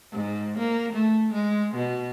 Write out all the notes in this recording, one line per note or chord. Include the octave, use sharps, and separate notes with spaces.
G#2
A#3
A3
G#3
B2